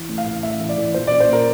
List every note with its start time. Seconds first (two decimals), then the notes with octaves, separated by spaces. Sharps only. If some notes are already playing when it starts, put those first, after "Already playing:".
Already playing: E3
0.09 A2
0.18 F5
0.26 E3
0.43 A2 E5
0.60 E3
0.69 D5
0.78 E3
0.94 A#2 C5
1.07 D5
1.12 A#2
1.20 C5
1.29 A#2 A#4